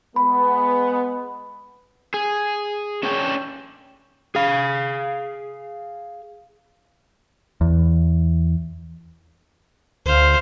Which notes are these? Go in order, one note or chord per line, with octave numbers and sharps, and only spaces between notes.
G#3 B3 B5
G#4
C#4 D4 C#5 G5
G#4 F5
E2
D2 C5 F5